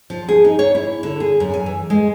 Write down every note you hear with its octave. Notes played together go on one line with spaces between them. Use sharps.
F3
G#4
D#4
C#5
E4
D3
G#4
F#2
G#5
E3
G#3